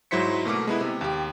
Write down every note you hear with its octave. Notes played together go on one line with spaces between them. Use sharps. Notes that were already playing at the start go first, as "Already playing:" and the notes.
G#2 F#3 E4 C5 B6 C#7
B2 A3 A#3 D6
G#3 B3 E4
C3
D#2 G4